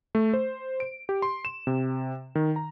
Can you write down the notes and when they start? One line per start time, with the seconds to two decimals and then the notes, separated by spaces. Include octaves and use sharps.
0.15 A3
0.33 C5
0.80 D7
1.09 G4
1.22 C6
1.45 E7
1.67 C3
2.35 D#3
2.56 A#5